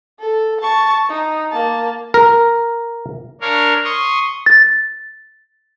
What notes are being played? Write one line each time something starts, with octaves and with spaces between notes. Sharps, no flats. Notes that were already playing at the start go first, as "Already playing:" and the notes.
A4
A5 C#6
D#4
A#3 A5
A#4
D4 A#4 C#5 F5
C6 C#6 D#6
A6